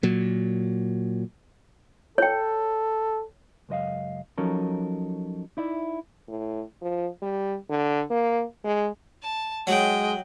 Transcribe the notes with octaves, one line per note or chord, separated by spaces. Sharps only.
A#2 F#3
A4 C#5 G5
C#2 F#2 D#5 F5
F3 F#3 C#4 D#4 A4 A#4
D#4 E4 D5 E5
A2
F3
G3
D3
A#3
G#3
A5
F#3 G#3 D#5 G5